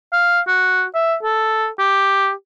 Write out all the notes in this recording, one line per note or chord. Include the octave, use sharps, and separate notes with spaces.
F5
F#4
E5
A4
G4